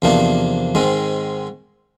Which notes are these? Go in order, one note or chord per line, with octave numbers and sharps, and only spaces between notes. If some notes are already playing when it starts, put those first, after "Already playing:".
E2 C3 F3 A#3 D4
G#2 D#3 G#3 C4